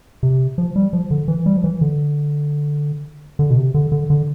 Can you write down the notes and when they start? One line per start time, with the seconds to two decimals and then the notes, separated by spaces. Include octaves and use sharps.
0.23 C3
0.58 F3
0.76 G3
0.93 F3
1.11 D3
1.28 E3
1.46 G3
1.57 F3
1.64 E3
1.81 D3
3.39 D3
3.50 B2
3.57 C3
3.74 D3
3.92 D3
4.10 D3